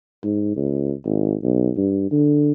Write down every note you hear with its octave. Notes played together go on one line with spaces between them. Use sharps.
G#2
C#2
G#1
B1
G2
D3